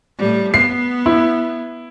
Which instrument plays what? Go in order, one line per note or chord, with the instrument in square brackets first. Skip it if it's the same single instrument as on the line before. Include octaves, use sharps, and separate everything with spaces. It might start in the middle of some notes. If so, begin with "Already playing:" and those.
[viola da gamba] A2 G3
[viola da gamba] B3 [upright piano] C7
[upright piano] E4